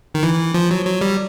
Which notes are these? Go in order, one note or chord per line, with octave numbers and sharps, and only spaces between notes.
D#3
E3
F3
F#3
F#3
G3